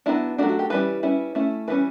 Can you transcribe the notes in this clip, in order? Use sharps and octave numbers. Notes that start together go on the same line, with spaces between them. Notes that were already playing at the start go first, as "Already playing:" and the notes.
F#3 B3 D4 E4
F#3 A3 D4 F#4
F#4
G4
E3 G3 C#4 E4 B4
G3 C#4 E4
A3 C#4 E4
E3 G3 C#4 B4